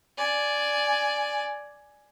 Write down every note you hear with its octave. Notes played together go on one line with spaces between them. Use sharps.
D5 G#5